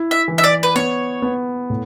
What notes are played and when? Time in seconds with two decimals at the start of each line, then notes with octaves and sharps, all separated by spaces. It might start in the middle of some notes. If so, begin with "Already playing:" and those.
Already playing: E4
0.11 E5
0.28 E3
0.38 E5
0.44 D5
0.63 B4
0.75 B3 C#5
1.22 B3
1.70 A2